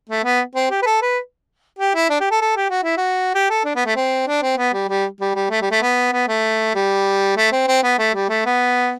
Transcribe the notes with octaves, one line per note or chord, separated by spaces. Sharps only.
A3
B3
C4
G4
B4
A4
B4
G4
E4
D4
G4
A4
A4
G4
F#4
E4
F#4
G4
A4
D4
B3
A3
C4
D4
C4
B3
G3
G3
G3
G3
A3
G3
A3
B3
B3
A3
G3
A3
C4
C4
B3
A3
G3
A3
B3